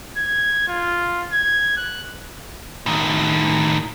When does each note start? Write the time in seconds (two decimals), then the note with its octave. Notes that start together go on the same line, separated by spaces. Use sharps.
0.17 G#6
0.68 F4
1.32 G#6
1.77 F#6
2.86 A2 D#3